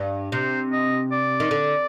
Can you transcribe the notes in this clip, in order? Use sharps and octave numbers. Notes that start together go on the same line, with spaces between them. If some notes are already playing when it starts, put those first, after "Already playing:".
Already playing: G2
C3 C5
D#5
D5
D#3
D3